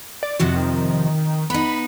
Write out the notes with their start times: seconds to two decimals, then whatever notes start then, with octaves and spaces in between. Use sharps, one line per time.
0.23 D5
0.39 F2 C3 F3 F#4
0.56 D#3
1.50 B3 D#4 B5